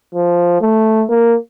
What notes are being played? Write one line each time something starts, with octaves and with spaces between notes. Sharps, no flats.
F3
A3
A#3